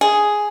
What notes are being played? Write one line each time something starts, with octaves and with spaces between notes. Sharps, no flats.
G#4